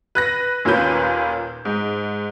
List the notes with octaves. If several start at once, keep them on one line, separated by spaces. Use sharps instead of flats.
B4 F#6 A#6
D#2 A#2 A#3 C#4 B4 G6
G#2